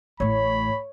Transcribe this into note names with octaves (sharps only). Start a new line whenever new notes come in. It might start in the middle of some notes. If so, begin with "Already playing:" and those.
A1 A2 C#5 B5